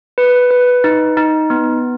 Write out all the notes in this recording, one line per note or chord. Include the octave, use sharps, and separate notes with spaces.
B4
B4
D#4
D#4
B3